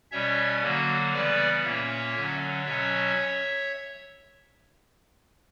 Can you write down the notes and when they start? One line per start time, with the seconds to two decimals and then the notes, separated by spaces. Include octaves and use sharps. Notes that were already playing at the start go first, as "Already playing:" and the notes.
0.11 B2 G3 C#4 C#5 E5
0.63 D3 F#3 A#3 F#4
1.14 C#3 E3 G3 B3 B4 D5
1.64 A#2 A#3 C#4 C#5 E5
2.15 D3 F#3 C#4
2.66 B2 F#3 C#4 C#5 E5